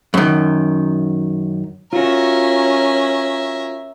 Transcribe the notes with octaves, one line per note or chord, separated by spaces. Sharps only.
F#2 D#3
C#4 F4 F#4 A#4 E5